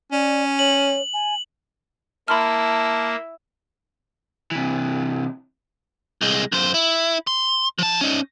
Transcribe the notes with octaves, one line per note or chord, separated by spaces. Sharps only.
C#4 D5
C#5 F#7
G#5
A#3 E4 A5 B5 C6 F6
C3 E3
C2 G#3
F#2 C5
E4
C6
F3 A5
C#4 D#4